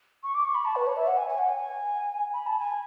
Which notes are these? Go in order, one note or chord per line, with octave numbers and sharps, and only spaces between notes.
C#6
D6
C#6
B5
A5
B4
C#5
E5
F#5
G#5
G#5
F#5
G#5
B5
A5
G#5